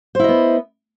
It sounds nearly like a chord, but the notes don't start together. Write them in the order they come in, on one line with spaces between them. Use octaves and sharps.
C5 E4 D#5 B3